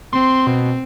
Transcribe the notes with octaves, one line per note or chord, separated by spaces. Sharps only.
C4 C6
B2